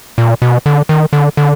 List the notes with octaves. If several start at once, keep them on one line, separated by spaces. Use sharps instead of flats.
A#2
B2
D3
D#3
D3
D3